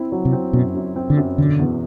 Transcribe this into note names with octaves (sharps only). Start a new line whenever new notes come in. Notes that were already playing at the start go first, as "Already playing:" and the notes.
Already playing: C4 E4
F#3
C3
C4
F#2 B2
F#2
C4
D3
F#2
E1 D3
E2